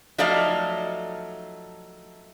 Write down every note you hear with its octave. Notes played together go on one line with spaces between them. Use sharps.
F3 F#3 A3 D#4 D5 F5